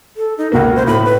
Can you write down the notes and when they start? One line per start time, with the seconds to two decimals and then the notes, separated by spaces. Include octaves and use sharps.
0.17 A4
0.38 D#4
0.52 C#2 B2 A#3 F#4
0.76 C5
0.87 A2 B5
1.05 B4